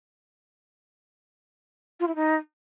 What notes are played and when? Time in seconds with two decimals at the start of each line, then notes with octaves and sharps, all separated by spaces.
2.00 F4
2.07 E4
2.15 D#4